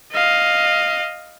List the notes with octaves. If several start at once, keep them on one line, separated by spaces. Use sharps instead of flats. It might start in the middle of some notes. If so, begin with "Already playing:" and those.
D#5 F5